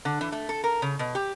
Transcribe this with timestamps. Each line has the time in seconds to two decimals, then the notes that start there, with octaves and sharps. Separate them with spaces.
0.05 D3
0.21 E3
0.32 A3
0.49 A4
0.64 A#4
0.82 C#3
0.99 B2
1.15 G4